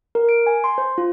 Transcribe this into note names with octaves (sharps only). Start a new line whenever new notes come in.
A#4
D7
G#5
C6
C5
F4